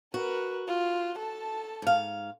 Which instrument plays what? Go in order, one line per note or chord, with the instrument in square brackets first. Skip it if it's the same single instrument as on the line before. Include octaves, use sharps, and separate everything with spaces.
[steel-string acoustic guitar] F#4 [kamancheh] A#4 B4
[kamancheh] F4
A4 A5
[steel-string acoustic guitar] G#2 F5